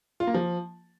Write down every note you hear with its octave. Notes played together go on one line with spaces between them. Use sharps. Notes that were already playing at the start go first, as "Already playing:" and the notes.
F4
A#3
F3